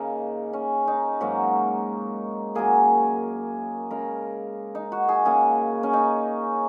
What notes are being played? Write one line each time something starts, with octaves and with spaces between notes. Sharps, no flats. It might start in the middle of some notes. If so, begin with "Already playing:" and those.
Already playing: C#3 A#3 D#4
C#4
D#4
G#2 F#3 A#3 F#4
F#2 F#3 A#3 G#4
C#3 G#3 A#4
D#4
F#4
G#4
C#3 A#3 G#4
C#4
D#4